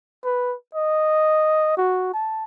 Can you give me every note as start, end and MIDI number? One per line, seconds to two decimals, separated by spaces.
0.24 0.55 71
0.75 1.74 75
1.77 2.10 66
2.14 2.44 81